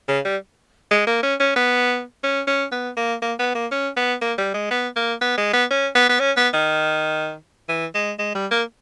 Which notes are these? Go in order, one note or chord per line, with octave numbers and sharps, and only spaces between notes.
C#3
G3
G#3
A#3
C#4
C#4
B3
C#4
C#4
B3
A#3
A#3
B3
A#3
C#4
B3
A#3
G3
G#3
B3
A#3
B3
G#3
B3
C#4
B3
B3
C#4
B3
D#3
E3
G#3
G#3
G3
A#3